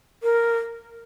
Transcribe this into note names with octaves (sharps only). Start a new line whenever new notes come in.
A#4